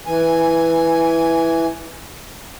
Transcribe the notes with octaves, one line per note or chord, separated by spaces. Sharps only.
E3 G#5